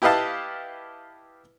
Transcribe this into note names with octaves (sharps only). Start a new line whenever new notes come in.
E4 G4 B4 D#5 F5 A5